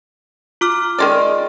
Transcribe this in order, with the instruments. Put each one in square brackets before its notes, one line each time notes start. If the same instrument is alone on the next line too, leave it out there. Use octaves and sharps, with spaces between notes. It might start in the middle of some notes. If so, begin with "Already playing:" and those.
[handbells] F4 D6 F6
[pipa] D#3 G#3 D5